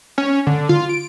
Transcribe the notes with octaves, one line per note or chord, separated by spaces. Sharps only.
C#4
D3
F4
D7